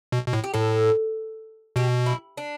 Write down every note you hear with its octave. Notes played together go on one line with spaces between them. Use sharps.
B2
B2
A2
G4
A2 A4
B2 G4
E4
D4